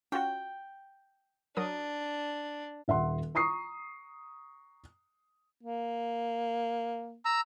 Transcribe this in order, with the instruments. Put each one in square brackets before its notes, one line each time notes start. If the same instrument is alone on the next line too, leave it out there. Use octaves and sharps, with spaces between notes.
[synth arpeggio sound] C#4 F4 F#4 [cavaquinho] G5
[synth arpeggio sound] F#3 A#4 D#6 [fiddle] D4
[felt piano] D#1 E5 F#5 C6
A#5 C#6 D#6 C7
[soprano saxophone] A#3
[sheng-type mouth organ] A#5 E6